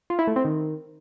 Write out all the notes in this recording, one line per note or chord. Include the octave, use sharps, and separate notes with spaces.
F4
E4
A3
C4
D#3